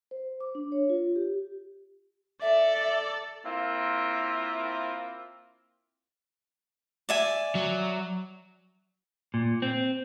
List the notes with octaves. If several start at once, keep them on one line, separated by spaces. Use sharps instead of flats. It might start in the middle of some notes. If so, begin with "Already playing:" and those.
C5
D6
D4
C#5
F4
G4
A4 D5 E5
A#3 C4 E4 F4
D5 E5 G#5
F#3
A#2
C4